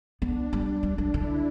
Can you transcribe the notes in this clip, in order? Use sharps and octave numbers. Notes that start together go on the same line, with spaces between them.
B3 D4
G3 D4
G3 D4
F#3
D3 E4